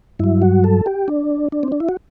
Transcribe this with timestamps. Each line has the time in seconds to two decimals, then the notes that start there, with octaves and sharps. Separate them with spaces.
0.19 G2 F#3 E4
0.42 F#4
0.64 A4
0.86 G4
1.08 D4
1.52 D4
1.63 C4
1.72 D4
1.80 E4
1.89 F#4